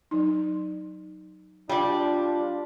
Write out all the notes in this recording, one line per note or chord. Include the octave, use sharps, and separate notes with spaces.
F#3 D#4
G3 D4 F4 D5